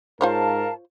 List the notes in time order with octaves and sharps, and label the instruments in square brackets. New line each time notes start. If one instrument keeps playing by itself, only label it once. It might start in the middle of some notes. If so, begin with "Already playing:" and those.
[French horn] G#2 [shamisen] F4 C5 C#5 [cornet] A#4 [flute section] F5 A5